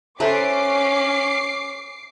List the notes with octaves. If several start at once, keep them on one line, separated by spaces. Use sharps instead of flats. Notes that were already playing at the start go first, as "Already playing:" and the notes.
C#4 A4 B4 C5 E5 A#5 D6 C7